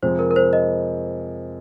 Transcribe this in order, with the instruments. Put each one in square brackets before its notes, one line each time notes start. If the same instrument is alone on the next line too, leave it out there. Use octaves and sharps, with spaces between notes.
[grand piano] F2 C3 F3 G#3 [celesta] C5
[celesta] A#4
A#4
C5
D#5